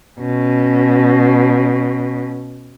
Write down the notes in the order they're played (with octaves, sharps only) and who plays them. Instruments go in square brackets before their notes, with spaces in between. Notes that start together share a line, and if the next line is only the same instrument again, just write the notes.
[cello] B2 C#4